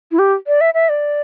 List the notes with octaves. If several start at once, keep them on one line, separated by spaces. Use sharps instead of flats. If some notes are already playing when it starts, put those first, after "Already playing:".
E4
G4
D5
E5
E5
D5